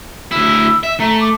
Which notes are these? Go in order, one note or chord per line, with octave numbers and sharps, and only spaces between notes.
D2 E4 E6
E5
A3 A#5
D6